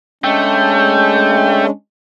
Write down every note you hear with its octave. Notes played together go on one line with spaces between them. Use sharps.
G#3 A3 C#4 D4 G5